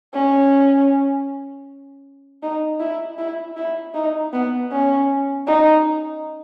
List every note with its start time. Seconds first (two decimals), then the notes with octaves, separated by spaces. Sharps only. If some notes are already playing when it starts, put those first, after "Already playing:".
0.14 C#4
2.42 D#4
2.80 E4
3.18 E4
3.56 E4
3.95 D#4
4.33 B3
4.71 C#4
5.47 D#4